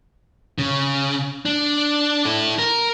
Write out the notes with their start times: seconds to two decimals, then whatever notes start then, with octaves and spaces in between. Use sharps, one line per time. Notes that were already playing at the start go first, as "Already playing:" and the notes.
0.58 C#3
1.46 D4
2.25 E4 A4
2.59 A#4